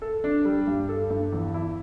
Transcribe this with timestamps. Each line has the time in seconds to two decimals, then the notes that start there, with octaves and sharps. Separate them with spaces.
0.02 A4
0.24 D4
0.45 G3
0.67 G2
0.89 A4
1.10 G2
1.33 E2
1.54 E4